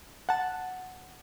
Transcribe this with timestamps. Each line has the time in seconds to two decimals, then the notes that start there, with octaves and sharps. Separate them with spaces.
0.29 F#5 A5